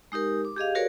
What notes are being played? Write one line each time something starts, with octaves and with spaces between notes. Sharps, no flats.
G#3 D#4 G4 A#4
D6
G4 G#4 D#5 F5
F#4 G#4 A#4 B4 C#5 D5